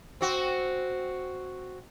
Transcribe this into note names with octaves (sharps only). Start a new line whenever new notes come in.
C4 F#4